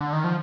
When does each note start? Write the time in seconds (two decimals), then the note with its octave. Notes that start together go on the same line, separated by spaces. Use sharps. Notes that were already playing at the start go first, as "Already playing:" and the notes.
0.01 D3
0.13 D#3
0.24 F3